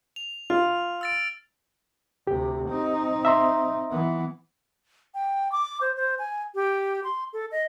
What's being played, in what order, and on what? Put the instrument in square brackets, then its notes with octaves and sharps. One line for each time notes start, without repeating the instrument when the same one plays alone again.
[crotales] F7
[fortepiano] F4 [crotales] F6
[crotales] E6 A6 D7
[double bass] D2 C3 [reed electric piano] G4
[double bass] C4 D#4
[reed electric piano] E5 A#5 C6
[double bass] E3 B3
[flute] G5
D6
C5
C5
G#5
G4
C6
A4
D#5